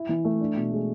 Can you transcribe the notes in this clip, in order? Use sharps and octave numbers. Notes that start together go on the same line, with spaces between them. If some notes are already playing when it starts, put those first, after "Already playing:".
Already playing: E4
E3
A3
D4
B2
G#3